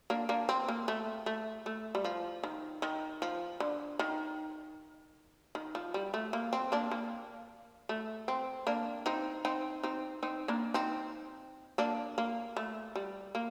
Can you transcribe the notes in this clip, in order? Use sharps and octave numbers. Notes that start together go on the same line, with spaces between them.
A#3 D4
A#3 D4
C4
A#3
A3
A3
A3
G3
F3
D#3
D#3
F3
D3
D#3
D#3
F3
G3
A3
A#3
C4
A#3 D4
A#3
A3
C4
A#3 D4
C4 D#4
C4 D#4
C4 D#4
C4 D#4
A#3 D4
C4 D#4
A#3 D4
A#3
A3
G3
A#3